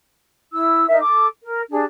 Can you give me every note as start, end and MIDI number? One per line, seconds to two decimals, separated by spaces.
0.53 0.85 64
0.53 0.85 88
0.89 0.98 63
0.89 0.98 70
0.89 0.98 75
0.89 0.98 76
1.01 1.27 69
1.01 1.27 86
1.43 1.62 70
1.70 1.84 62
1.70 1.84 67
1.70 1.84 68